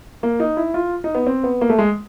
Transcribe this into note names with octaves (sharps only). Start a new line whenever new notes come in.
A#3
D#4
E4
F4
D#4
B3
C4
B3
A#3
A3
G#3